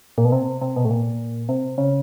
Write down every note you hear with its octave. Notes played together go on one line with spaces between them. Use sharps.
A#2
B2
C3
C3
B2
A2
A#2
C3
C#3